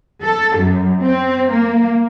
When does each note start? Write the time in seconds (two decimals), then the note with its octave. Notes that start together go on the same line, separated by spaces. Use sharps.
0.22 A4
0.57 F#2
1.02 C4
1.52 A#3